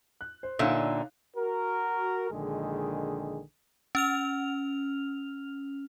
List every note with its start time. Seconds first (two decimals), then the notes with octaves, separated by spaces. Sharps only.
0.21 F#6
0.43 C5
0.59 A#2 D3 D#4 C#5 E5 F5
1.37 F#4 A#4
2.31 A#1 D3 D#3 G#3 G#4
3.95 C#4 F6 F7